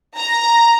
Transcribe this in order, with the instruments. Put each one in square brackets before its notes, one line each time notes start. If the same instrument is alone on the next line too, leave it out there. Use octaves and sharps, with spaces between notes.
[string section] A#5